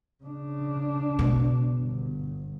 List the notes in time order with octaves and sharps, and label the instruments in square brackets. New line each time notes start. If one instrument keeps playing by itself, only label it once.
[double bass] C#3 D4
[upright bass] B2
[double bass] G1